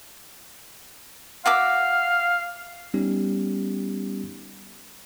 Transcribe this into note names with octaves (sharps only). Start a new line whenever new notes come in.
F#4 E5 F5 D6
G3 B3 C#4 D#4 G4